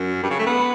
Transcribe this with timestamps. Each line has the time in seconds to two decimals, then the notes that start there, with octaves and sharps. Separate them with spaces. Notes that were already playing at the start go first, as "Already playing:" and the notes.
Already playing: F#2
0.23 G2
0.30 C#3
0.39 A3
0.47 B3